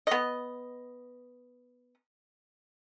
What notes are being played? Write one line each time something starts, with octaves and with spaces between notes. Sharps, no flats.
B3 D#5